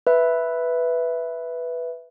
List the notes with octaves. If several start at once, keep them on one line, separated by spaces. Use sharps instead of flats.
B4 E5